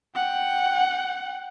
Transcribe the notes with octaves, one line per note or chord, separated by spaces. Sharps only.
F#5 G5